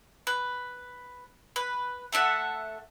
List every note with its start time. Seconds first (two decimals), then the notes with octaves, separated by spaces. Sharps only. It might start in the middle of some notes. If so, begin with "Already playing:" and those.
0.27 B4
1.56 B4
2.12 A3 A4 E5 F#5